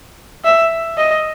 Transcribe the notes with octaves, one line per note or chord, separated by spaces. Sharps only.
E5
D#5